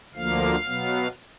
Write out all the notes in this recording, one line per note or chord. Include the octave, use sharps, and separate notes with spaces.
D2 D3 F3 A#3 F5
B2 F#3 B3